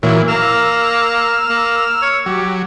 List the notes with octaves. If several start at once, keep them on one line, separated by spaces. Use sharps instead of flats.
A#2 E3 F#3
A#3 E6 F6
A#3
C#5
F#3 G4